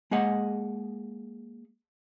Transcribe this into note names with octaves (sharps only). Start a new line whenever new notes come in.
G#3 A#3 G#4 D#5 F#5